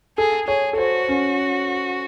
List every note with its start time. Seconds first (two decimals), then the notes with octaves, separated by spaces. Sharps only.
0.18 G#4 A4
0.48 G#4 C#5
0.73 A4
0.78 F#4 C5
1.09 C#4